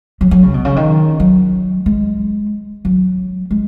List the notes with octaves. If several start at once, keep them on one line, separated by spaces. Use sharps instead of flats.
F#3
F#3
C#3
B2
C#3
D#3
F#3
G#3
F#3
G#3